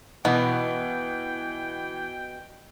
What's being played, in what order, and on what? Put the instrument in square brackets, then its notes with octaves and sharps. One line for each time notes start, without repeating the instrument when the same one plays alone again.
[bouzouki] B2 [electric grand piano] E3 [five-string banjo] B3 [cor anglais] G5